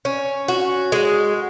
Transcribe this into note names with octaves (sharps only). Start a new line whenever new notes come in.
C#4
F#4
G#3